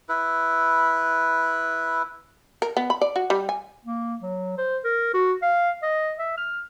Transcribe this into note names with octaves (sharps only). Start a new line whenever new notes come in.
E4 B4
A#4
B3
B5
D5
F#4
G3
G#5
A#3
F#3
C5
A#4
F#4
F5
D#5
E5
F6